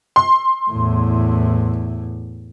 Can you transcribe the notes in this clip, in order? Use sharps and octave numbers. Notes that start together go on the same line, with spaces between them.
C6
E2 A2